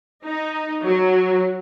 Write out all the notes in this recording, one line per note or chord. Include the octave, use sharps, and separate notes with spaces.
D#4
F#3